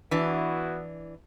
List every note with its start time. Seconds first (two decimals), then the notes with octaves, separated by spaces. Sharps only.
0.11 E3 B3 D4 E4 F#4